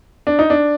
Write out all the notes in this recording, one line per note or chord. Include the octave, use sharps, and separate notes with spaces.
D4
D#4
D4